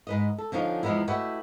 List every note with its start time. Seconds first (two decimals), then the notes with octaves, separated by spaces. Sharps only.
0.07 G#2 B4 D#5
0.38 A4
0.52 D3 F3 C#4 D#4 F5
0.83 E2 F3 G#3 B3 D#4 E4
1.07 A3 E4 F#4 G4 B4 D#5